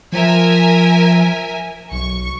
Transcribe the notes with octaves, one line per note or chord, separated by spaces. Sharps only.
F3 A#4 E5 G#5
B1 C#6